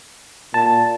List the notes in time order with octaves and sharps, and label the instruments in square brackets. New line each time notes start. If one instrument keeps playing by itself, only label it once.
[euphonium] A#2 [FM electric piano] A5